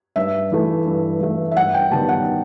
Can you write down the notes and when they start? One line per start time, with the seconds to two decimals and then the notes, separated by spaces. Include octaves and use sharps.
0.16 G2 E5
0.52 E3 A3
0.86 G2
1.21 E3 A3
1.51 E5
1.56 G2 F#5
1.74 G5
1.91 D#3 G3 B3 A5
2.09 F#5